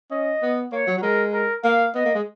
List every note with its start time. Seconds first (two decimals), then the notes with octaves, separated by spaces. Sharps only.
0.11 C#4 D#5
0.42 B3
0.72 A#3 C#5
0.87 F#3
0.98 F#3
1.02 G#3 A#4
1.33 A#4
1.64 A#3 F5
1.95 B3 D#5
2.05 A#3
2.15 G#3